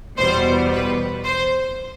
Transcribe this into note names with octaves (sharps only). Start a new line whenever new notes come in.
E2 B2 G3 C5
B4
C5